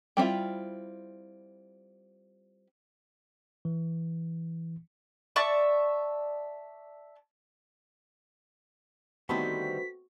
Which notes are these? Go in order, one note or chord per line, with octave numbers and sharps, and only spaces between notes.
G3 C4 C#4 E4 F4
E3
D5 E5 A5 C#6
D3 D#3 G3 A3 B3 C4 F#4 B6